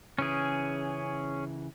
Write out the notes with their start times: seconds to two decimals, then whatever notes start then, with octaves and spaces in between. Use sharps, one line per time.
0.19 C#3 E3 C#4 G#4